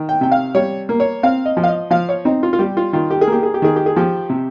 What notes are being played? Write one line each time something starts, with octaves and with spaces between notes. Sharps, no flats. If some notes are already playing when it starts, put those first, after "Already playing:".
Already playing: D#3
G5
C3 G5
F5
G3 C#5
A#3
C#5
C4 F5
D#5
F3
F5
D#5
F3 F5
C#5
C4 D#4
F4
F4
G3 G4
F4
D#3 F4
G4
G#4
A#3 G4
G#4
G4
D#3 G#4
G4
G#4
F3 G4
C3